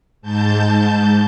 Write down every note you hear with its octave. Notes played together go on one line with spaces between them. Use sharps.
G#2 A5 G6